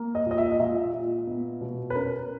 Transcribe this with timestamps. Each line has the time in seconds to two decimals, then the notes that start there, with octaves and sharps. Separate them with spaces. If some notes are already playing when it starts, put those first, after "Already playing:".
Already playing: A#3
0.15 D#5
0.26 A#2 D#5
0.38 E5
0.52 D#5
0.60 A#2 E5
0.93 A#2
1.27 B3
1.61 B2
1.90 B4
1.95 C#4 A#4